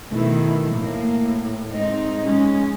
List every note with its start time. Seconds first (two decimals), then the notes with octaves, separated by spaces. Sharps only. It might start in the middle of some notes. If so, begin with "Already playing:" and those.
0.10 B2 D#3 A3 E4
0.72 A2 A#3
1.71 G#3 C4 D#4
2.26 G#3 C#4